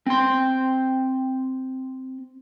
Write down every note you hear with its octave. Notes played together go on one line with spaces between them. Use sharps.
C4 C6